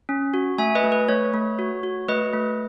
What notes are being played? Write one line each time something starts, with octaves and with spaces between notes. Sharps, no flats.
C#4
F#4
A3 E5 G#5
B4 D#5
A3
B4
A3 C#5
A3
F#4
F#4
A3 B4 D#5
A3